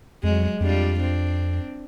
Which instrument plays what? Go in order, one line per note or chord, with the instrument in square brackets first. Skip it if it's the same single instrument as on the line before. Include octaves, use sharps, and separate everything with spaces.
[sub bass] F2 [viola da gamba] F#3 G#3
[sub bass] F2 [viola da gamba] G3 D4 F4
[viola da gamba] C4 D4